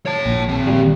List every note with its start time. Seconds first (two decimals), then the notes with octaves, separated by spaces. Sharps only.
0.06 C#5 A5
0.26 A#1
0.49 D#3 C4
0.67 A#1 G3